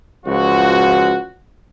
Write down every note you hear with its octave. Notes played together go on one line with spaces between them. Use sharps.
C#2 F3 F#4